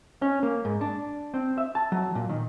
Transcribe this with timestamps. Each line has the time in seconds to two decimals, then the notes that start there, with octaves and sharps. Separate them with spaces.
0.22 C#4
0.43 A#3
0.65 G#2
0.81 D4
1.34 C4
1.58 E5
1.75 A5
1.92 F#3
2.15 A#2
2.29 D#3